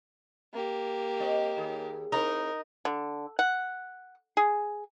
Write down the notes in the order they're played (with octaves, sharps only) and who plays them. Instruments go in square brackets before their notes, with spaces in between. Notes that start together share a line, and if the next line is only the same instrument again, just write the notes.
[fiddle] A#3 G4
[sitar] C4 D#5
D#2 G#4
[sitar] C4 E4 [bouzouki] D#4 [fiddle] A#4
[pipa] D3
F#5
G#4